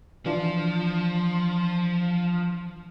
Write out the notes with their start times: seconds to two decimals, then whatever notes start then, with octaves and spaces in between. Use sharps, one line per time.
0.26 E3 F3 D4 F4